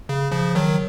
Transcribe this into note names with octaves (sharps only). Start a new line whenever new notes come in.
C#3
C#3 F3
D#3 F#3